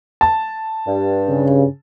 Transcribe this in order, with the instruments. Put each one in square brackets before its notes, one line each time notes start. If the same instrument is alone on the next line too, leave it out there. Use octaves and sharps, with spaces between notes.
[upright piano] A5
[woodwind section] G2
[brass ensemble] C#3